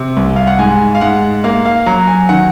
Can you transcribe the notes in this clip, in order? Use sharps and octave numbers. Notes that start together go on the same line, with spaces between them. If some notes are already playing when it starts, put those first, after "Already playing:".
Already playing: C3
C2
F5
F#5
G#2 G#5
F5
G#2 F#5
A#3 F5
F5
F#3 A#5
G#5
D#3 F#5